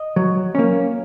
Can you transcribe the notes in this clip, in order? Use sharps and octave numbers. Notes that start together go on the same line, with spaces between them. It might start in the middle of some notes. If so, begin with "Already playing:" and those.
Already playing: D#5
F#3
A#3 C#4